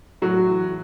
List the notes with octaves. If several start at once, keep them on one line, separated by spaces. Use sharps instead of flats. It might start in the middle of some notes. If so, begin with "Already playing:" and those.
A2 F#3 F#4
E3